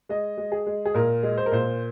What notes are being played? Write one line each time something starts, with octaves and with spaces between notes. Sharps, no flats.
G#3 D#5
G#3
G#4
G#3
G#4
A#2 A#4
G#3
C5
A#4
A#2 C5